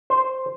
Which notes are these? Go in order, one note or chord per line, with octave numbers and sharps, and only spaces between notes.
C5